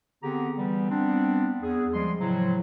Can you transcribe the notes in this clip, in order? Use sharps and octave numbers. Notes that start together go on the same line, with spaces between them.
D3 B3 C4 G4 G#4 A#5
E3 G3 B3
G3 B3 C4 D4
E2 G#4
F3 G3 G#3 C6
A2 C#3 F3 F#3